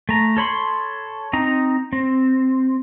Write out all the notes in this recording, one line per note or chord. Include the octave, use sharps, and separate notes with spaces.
A3 A#5
A4 C#5 B5 C6
C4 D#4 A#5
C4